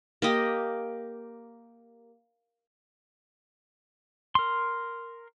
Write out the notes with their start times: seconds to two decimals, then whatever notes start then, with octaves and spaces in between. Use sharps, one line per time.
0.22 A#3 G4 D#5
4.35 A#4 C6